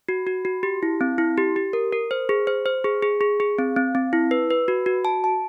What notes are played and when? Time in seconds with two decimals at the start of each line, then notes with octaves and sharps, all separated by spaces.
0.09 F#4
0.27 F#4
0.45 F#4
0.63 G4
0.83 E4
1.01 C4
1.18 E4
1.38 G4
1.56 G4
1.73 A#4
1.93 A#4
2.11 C5
2.29 G#4
2.47 C5
2.66 C5
2.84 G#4
3.02 G#4
3.21 G#4
3.40 G#4
3.58 C4
3.76 C4
3.95 C4
4.13 E4
4.31 B4
4.50 B4
4.68 F#4
4.86 F#4
5.05 A5
5.24 A5